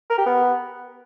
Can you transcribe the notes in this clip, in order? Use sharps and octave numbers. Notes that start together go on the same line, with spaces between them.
A#4
G4
B3